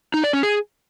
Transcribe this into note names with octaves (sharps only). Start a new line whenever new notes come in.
D#4
D5
C#4
G#4